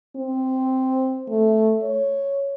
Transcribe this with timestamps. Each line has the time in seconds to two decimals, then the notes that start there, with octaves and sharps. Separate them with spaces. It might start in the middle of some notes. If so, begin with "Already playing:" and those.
0.16 C4
1.29 A3
1.83 C#5